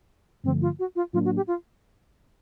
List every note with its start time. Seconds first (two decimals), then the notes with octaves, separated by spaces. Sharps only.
0.44 G2 D3 F3 A3 C4
0.61 F4
0.79 F#4
0.96 F4
1.13 A2 F#3 A#3 D4 F4
1.25 F#4
1.36 G4
1.47 F4